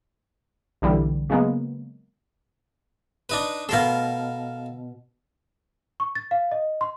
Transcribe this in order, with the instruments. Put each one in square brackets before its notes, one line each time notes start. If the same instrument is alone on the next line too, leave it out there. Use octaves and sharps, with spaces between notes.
[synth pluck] B1 D3 E3 G3
C#3 F#3 G#3 A#3 B3
[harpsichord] D4 D#4 B4
[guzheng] B2 C6 [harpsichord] A4 A#4 F5
[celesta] C#6
A6
F5
D#5
C6